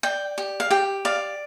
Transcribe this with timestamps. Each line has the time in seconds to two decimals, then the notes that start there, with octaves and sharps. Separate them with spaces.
0.03 D5 G5
0.38 G4
0.60 F5
0.70 G4 G5
1.05 D5 F5